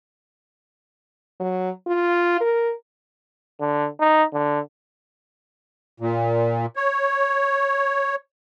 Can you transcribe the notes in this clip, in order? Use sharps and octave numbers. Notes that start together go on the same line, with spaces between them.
F#3
F4
A#4
D3
D#4
D3
A#2
C#5